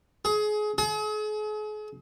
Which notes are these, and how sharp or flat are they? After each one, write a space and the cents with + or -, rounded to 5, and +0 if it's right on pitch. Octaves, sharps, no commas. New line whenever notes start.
G#4 +25
G#4 +40